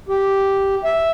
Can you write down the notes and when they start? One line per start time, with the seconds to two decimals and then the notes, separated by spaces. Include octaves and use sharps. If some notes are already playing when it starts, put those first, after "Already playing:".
0.09 G4
0.84 E5